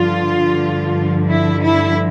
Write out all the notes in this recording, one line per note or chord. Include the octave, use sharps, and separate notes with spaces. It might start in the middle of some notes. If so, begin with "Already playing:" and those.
Already playing: G2 D3 F3 F4
E4
E4